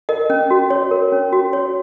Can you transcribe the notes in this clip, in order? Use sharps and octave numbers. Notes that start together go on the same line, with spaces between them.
A#4 D#5
C#4
F#4
C#5
A#4
C#4
F#4
C#5